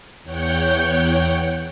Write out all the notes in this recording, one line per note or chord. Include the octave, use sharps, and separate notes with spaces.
E2 C#5 F#5 G5 G6